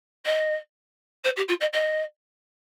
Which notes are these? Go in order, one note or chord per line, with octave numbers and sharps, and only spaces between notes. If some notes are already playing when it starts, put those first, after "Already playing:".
D#5
C5
G4
F4
D#5
D#5